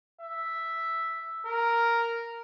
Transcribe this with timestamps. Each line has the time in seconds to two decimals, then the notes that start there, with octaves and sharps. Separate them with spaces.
0.21 E5
1.46 A#4